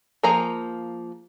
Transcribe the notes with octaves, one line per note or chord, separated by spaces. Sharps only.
F3 A#3 G#4 G#5 A#5